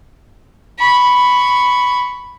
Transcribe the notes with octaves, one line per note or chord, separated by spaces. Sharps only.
B5 C#6